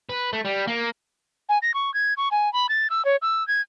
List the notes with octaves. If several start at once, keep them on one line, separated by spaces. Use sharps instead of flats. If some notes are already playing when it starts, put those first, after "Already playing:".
B4
A3
G3
A#3
G#5
A#6
C#6
G#6
C#6
G#5
B5
A6
E6
C#5
E6
G#6